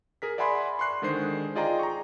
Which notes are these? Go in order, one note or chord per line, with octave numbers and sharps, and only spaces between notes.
G#4 A#4 B6
D5 E5 F#5 G#5 B5 C6
C6 C#6 F#6 C7
D3 D#3 G#3 G#4 C5 C7
F4 G#4 D5 D#5 G5 A#5
A#5 C#6